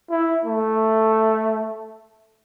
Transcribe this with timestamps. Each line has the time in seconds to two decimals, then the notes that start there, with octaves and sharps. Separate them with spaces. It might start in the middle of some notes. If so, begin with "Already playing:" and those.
0.10 E4
0.45 A3